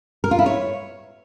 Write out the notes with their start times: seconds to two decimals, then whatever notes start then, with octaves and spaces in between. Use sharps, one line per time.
0.24 A#4
0.31 F4
0.39 E4
0.46 C#5